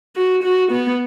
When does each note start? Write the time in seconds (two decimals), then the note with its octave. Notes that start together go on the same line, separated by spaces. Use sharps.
0.16 F#4
0.43 F#4
0.72 B3